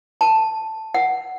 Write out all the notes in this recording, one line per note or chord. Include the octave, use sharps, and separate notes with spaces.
A5
F#5